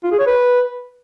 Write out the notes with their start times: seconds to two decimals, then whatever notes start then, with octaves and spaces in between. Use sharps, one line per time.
0.04 F4
0.12 G#4
0.19 C#5
0.27 B4